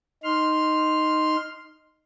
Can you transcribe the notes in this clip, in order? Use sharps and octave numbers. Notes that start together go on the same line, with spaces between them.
D#4 C6 F6